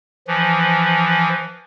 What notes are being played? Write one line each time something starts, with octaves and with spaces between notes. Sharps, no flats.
E3 F3